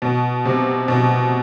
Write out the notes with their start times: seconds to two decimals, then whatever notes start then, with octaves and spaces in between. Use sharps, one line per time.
0.02 B2
0.45 C3
0.88 B2